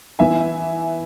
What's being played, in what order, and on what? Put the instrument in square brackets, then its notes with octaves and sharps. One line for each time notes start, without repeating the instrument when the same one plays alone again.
[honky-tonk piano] E3 B3 E5 G#5